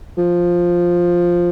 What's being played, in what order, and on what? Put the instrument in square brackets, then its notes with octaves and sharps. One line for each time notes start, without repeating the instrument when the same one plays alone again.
[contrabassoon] F3